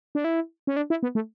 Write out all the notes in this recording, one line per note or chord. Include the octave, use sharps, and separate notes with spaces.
D4
E4
C#4
D4
E4
B3
A3